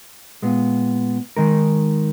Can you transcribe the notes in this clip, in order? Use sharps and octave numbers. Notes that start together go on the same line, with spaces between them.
A#2 G#3 B3
D#3 G#3 D#4 A#4